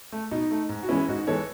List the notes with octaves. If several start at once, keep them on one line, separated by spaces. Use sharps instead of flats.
A3
B2 D#4
A3
G#2
F#4
E3 G#3 B3 C#4 E4
G#2 D#4 F#4
E3 G#3 B3 A4 C#5